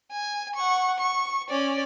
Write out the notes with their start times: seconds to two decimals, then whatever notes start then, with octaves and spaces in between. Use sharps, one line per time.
0.11 G#5
0.55 F#5 C#6
0.99 C#6
1.49 C#4 D5